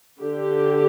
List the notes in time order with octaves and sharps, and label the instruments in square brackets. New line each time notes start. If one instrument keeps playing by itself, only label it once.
[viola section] D3 G4